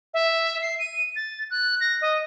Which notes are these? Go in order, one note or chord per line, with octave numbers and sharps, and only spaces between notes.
E5
C7
D#7
A6
F#6
A#6
D#5